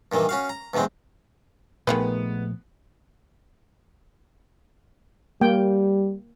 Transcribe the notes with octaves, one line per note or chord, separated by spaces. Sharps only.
G2 A#2 D#3 E3
C#4 F#4 F5
A#5
E2 G2 B2 G#3 C4
A#2 D#3 F3 G#3 A3 B3 B4
G3 A#3 G5